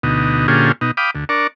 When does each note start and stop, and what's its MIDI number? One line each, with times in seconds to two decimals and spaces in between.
0.03 0.47 38
0.03 0.47 47
0.03 0.47 63
0.48 0.72 46
0.48 0.72 50
0.48 0.72 61
0.48 0.72 65
0.48 0.72 67
0.48 0.72 68
0.81 0.91 47
0.81 0.91 63
0.97 1.11 77
0.97 1.11 79
0.97 1.11 83
0.97 1.11 86
0.97 1.11 87
1.15 1.25 38
1.29 1.47 62
1.29 1.47 70
1.29 1.47 74
1.29 1.47 85